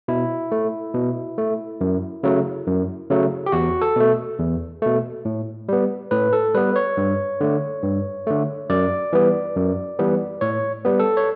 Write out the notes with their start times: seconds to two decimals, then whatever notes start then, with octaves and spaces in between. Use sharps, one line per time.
0.08 B2 E4
0.52 A3
0.94 B2
1.38 A3
1.81 F#2
2.23 C#3 F#3 A3
2.67 F#2
3.10 C#3 F#3 A3
3.46 G4
3.52 E2 F#4
3.82 A4
3.96 B2 A3
4.39 E2
4.82 B2 A3
5.25 A2
5.69 G3 B3
6.11 A2 B4
6.33 A4
6.54 G3 B3 B4
6.76 C#5
6.97 G2
7.41 D3 A3
7.83 G2
8.27 D3 A3
8.70 F#2 D5
9.13 E3 G3 B3
9.56 F#2
9.99 E3 G3 B3
10.41 A2 C#5
10.85 G3 B3
11.00 A4
11.17 C#5